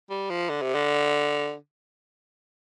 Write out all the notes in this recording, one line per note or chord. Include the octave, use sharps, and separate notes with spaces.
G3
F3
D3
C3
D3